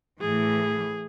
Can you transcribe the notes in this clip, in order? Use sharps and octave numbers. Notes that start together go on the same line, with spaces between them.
A2 E3 G#4